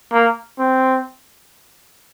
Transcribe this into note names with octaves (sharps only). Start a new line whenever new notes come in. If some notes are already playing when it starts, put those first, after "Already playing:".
A#3
C4